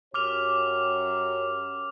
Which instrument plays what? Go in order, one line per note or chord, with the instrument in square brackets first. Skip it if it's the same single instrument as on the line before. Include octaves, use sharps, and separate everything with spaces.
[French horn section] F#2 G4 C#5 [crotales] D6 F6 F7